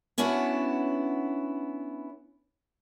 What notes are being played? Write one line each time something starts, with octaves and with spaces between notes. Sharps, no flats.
B3 C#4 D4 E4 F#4